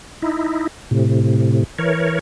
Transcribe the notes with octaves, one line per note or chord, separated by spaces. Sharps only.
D#4 E4
A2 C3
E3 A#4 C#5